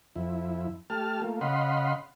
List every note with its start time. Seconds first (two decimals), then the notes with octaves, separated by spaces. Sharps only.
0.16 F2 E4
0.90 A3 G4 A5 F6
1.22 A3 A#3 F4
1.41 C#3 D#5 F5 F#5 B5 C6